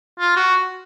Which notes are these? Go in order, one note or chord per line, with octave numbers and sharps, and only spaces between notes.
F4
F#4